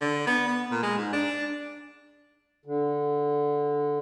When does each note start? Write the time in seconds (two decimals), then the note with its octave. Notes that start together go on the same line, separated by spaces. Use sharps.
0.01 D3
0.27 B3
0.48 B3
0.71 A#2
0.82 G#3
0.98 G#2
1.13 D4
2.65 D3